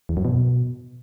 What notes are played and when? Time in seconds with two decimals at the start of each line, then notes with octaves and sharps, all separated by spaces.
0.09 E2
0.17 F#2
0.25 B2